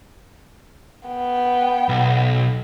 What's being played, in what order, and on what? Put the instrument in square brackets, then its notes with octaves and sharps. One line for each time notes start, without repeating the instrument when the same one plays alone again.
[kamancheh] B3 G5
[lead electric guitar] B1